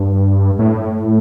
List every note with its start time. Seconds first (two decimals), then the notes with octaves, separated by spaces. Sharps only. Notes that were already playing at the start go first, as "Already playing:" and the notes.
Already playing: G2
0.59 A2